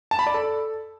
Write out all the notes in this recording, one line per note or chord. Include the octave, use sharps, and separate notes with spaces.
A5
B5
D5
A4